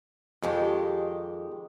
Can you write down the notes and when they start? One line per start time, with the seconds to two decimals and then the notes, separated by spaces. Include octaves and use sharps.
0.43 F2 D#3 G#3 G4